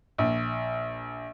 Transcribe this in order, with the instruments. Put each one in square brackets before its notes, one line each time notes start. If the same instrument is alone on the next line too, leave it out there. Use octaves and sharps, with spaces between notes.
[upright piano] A#1